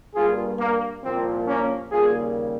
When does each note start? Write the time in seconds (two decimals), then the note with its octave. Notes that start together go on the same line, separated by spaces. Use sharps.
0.14 G2 G3 A#3 F4 G#4
0.60 A#3
1.03 C2 A#2 F3 A#3 C4
1.47 A#3 C#4
1.92 D#2 C#3 G3 A#3 F4 G#4